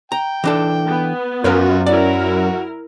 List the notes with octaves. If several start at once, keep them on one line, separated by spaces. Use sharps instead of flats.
G5 A#5
E3 D4 A4
B3
F#2 C#4 F4 F#4 A#4 B4
E4 F#4 A#4 D5